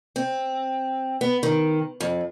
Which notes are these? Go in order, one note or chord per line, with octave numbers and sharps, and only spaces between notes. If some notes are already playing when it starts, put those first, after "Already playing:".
C4
B3
D#3
F2